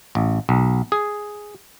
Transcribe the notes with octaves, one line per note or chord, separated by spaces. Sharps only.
A1
B1
G#4